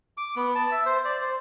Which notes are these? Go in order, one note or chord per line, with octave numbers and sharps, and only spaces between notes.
D6
B3
A5
E5
C5
D5
C5